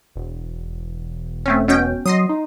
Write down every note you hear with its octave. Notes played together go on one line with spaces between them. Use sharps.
E1
A3 C4 C#4
B2 C#4 G5
F#3 D#5 C6 D#6
D#4